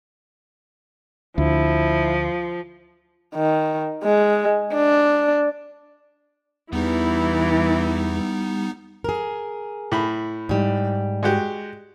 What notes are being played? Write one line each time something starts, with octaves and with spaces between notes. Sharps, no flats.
D2 F3 E4
D#3
G#3
D4
E2 E3 G3 B3 D#4
G#4 A#4
A2 B5
G#2 G3
G#3 F#4 G4